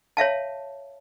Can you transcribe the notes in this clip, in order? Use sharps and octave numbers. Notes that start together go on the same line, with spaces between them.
C#5 E5 F5 A5